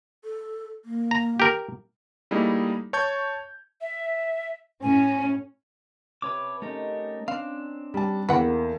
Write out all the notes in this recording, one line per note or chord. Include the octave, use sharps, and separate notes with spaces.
A4
A#3
A#5
G4 A#4
G3 A3 A#3 D#4 E4 G#4
C#5 A5 C#6 G6 G#6
E5
A2 C#4 G#5
C3 B4 C#5 A5 D6
A3 C#4 D#4 G4 A#4 B4
C4 D4 F5
G3 A5
E2 A#3 A4 B4 F#5 G5